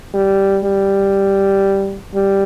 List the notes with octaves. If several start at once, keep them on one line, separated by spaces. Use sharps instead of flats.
G3
G3
G3